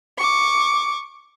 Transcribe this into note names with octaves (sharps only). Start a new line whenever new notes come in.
C#6 D6